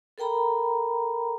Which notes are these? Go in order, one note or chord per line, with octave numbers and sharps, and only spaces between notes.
A4 A#4 G5 A#5 B5